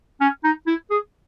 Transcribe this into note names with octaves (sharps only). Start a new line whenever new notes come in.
C#4
D#4
E4
G#4